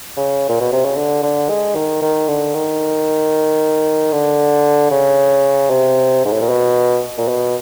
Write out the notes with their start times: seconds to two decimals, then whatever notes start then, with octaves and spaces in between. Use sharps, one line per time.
0.17 C#3
0.49 A#2
0.61 B2
0.72 C3
0.85 C#3
0.96 D3
1.23 D3
1.49 G#3
1.75 D#3
2.02 D#3
2.28 D3
2.54 D#3
4.12 D3
4.91 C#3
5.70 C3
6.25 G#2
6.33 A2
6.41 A#2
6.49 B2
7.18 A#2
7.28 B2